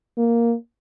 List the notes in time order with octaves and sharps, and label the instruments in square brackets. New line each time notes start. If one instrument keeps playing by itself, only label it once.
[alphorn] A#3